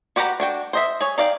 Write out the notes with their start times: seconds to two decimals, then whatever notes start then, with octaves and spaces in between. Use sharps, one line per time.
0.16 F#4 G4 B4 F#5 A#5
0.40 D4 F#4 G5
0.73 C5 D#5 E5
1.01 G#4 C#5
1.18 D#4 D5 F5 G5